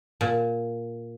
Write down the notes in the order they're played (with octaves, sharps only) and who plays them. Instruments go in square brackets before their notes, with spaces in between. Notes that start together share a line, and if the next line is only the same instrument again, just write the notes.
[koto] A#2